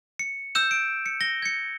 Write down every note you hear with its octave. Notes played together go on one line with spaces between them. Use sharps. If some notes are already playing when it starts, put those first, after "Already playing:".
C#7
E6 G6 E7
D7
C#7
A#6 G7
G#6 C#7